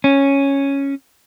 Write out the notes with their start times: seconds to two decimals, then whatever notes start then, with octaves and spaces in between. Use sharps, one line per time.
0.04 C#4